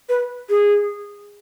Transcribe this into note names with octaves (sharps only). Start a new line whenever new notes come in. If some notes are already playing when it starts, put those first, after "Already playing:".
B4
G#4